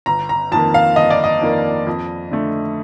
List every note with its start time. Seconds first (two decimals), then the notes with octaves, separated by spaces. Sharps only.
0.06 G1 A#5
0.29 A#5
0.52 F2 D#3 A#3 A5
0.74 F5
0.96 G1 D#5
1.10 D5
1.24 D#5
1.41 F2 D#3 A#3
1.87 F2
2.31 D3 A3